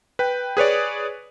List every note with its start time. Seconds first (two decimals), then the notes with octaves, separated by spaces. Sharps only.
0.19 B4 G5
0.57 G#4 B4 C#5 D5